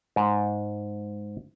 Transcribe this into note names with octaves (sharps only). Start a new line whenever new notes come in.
G#2